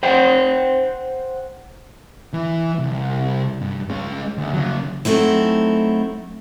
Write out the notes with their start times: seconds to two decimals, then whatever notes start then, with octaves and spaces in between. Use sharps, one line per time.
0.03 C5 F#5 G5
2.33 E3
2.79 C2
3.61 G2
3.90 G#3 C#4
4.38 D2
4.54 C#3 F#3
5.05 F#3 A3 C4 D#4 E4